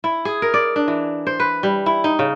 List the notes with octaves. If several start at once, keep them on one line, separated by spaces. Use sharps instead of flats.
E4
G#4
A#4
D5
D4
E3
C5
B4
G3
E4
D#4
C#3